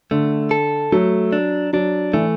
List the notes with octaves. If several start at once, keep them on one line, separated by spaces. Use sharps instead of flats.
D3 A3
A4
F#3 A3
D4
F#3 D4
E3 A3